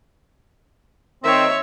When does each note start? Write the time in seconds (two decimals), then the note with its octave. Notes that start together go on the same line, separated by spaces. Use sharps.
1.24 D#3 C4 C#5 E5